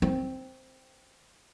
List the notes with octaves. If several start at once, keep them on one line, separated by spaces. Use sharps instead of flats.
C4